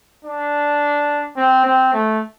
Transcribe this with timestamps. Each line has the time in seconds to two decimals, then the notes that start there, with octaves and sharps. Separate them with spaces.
0.25 D4
1.37 C4
1.65 C4
1.94 A3